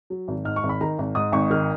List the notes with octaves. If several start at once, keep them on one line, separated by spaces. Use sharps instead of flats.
F#3
G#1
G#2 F6
C#6
G#1
B5
D#3 A#5
G#1
G#2 D#6
G#1 C#6
D#3 F6